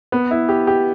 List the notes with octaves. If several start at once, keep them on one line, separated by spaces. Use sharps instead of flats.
B3
E4
G4
G4